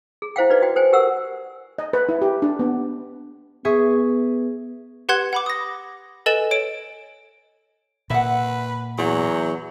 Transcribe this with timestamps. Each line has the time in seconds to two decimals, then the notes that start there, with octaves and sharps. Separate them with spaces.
0.22 G#4
0.36 E4 C5 F5 G5
0.50 D#4 F#4 B4 D5
0.62 F#4 G5
0.76 A4 C5 G5 G#5
0.93 G4 A#4 F#5 E6
1.78 D#5
1.93 B4
2.09 E4
2.22 G4
2.42 D4
2.59 B3
3.65 B3 G#4 E5 C#6
5.09 G4 B4 F#5 C6 F#6 G#6
5.33 F#5 B5 D6
5.46 D#6 A#6
6.26 A4 B4 D#5 G#5 A6 E7
6.51 C#5 D7
8.10 A#2 B4 E5 F#5
8.98 E2 F#3